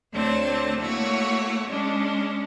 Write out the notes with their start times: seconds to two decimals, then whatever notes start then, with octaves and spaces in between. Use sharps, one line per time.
0.12 D2 D3 A3 C4 C#5 A5
0.80 A3 A#3 E4 F#4 C#5
1.68 G#3 C#4 D4